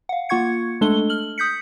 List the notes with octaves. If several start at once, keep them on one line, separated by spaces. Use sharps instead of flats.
F5 F#5
A#3 F4 F#5 C#6 G#6 C#7
G#3 A3 D4 A4 G7
F6 F#7
D#6 G6 B6 C#7